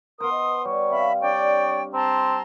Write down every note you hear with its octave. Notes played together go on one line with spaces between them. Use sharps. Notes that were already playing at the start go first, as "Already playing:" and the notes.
B3 A#4 C5 C6 D#6
D#5
G3 C#5
C4 E5 F5 B5
D4 G4 C#5 D5 G5
C4 A5 A#5 C6